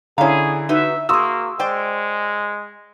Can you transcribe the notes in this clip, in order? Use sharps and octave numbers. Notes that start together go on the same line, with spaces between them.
D3 C#4 E4 G#4 C#5 F5 A#5
D#4 F#4 B4 E5
A#3 F#4 G#4 C6 C#6 D#6 E6
G#3 C5 D5 G5